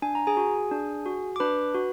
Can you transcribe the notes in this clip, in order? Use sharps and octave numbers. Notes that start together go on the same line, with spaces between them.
D4 G#5
A#5
G#4 G#5
F#4
D4
F#4
D6
D4 B4 B5
F#4